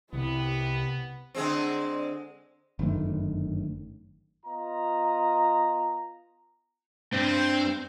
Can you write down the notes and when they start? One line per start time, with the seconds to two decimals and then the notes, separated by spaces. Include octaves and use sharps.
0.13 C2 C3 B3 E4 G4
1.35 D3 G#3 C4
2.79 G1 F#2 D#3 A3
4.45 B3 F4 D#5 A#5
7.13 G2 C4 C5